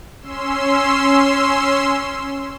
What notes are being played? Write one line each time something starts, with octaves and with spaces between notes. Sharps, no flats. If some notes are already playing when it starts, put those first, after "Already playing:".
C#4 C6 E6